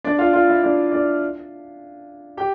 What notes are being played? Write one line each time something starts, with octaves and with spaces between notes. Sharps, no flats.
D4 D5
F4 F5
F4 F5
E4 E5
D4 D5
D4 D5
G4 G5